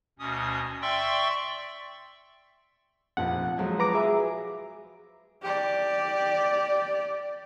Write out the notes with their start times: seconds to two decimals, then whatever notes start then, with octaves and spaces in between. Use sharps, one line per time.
0.19 D2 B2 C#4 D#6
0.82 D5 E5 G5 C6 C#6 E6
3.17 F1 A#1 F3 F#5
3.58 F3 F#3 G#3
3.79 B4 A#5 D6
3.94 G#4 E5
5.42 G4 D5